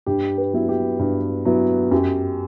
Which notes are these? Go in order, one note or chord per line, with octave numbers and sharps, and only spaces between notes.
G2 G4
B4
F#3 B3 E4
G4
G2
F#3 B3 E4
F#2 G4